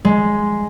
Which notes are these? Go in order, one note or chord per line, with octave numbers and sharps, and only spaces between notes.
G#3